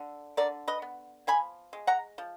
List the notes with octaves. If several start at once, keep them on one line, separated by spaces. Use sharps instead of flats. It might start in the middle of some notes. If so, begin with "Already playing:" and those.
Already playing: D3
D3 A#4 D5
B4 D#5
B3
F3 G#5 B5
G#3
F#5 A#5
F3